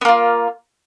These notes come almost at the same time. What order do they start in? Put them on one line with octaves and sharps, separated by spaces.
B3 A#3 F4